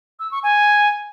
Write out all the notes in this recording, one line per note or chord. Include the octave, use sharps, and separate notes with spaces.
E6
C#6
G#5